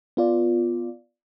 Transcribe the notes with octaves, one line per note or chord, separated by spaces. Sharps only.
B3 F4 D5